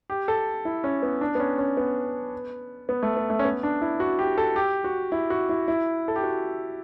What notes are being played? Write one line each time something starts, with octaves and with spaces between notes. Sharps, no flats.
G4
A4
E4
C#4
B3
D4
B3
C#4
C#4
B3
B3
A3
B3
A3
C#4
B3
D4
E4
F#4
G4
A4
G4
F#4
E4
F#4
E4
E4
A4
G4
F#4